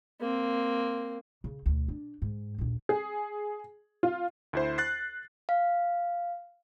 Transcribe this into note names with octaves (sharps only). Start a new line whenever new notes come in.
A#3 C4
C#3
D2 B2
D4
G#2
A#1 D#2
G#4
F4
D2 E4 C5
F#6 A6 C7
F5